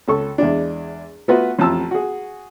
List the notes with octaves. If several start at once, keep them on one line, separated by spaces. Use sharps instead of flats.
C#2 A4 C#6
E2 G#3 D4
A3 B3 F4 F#4 B4
A1 F2 F4 A5 E6
F#4 G#4